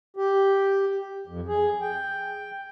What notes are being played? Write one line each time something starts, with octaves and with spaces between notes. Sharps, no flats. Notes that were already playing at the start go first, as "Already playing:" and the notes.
G4
F2
G#4
G5